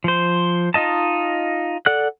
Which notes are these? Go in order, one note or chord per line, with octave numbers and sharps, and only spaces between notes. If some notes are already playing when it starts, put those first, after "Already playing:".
F3 C5
D#4 F4 D#5 A5
A4 D5 F#5 F#6